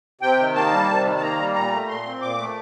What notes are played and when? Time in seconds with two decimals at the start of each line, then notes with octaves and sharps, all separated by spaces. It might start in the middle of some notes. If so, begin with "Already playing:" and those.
0.21 C3 G5
0.39 D#3
0.55 A#3 A5
0.71 G3
0.89 C3
1.05 D#3
1.17 A5
1.21 A#3 A#5
1.38 G3
1.54 A#2 A#5
1.72 A3
1.89 A#2 C6
2.06 C4
2.21 A#2 D6
2.38 A3